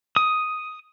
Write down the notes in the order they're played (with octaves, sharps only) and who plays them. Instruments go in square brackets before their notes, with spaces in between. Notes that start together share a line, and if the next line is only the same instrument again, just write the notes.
[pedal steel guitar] D#6